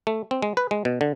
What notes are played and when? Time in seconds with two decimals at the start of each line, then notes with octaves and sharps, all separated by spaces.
0.07 A3
0.31 C4
0.42 G#3
0.57 B4
0.71 G#3
0.85 B2
1.01 D3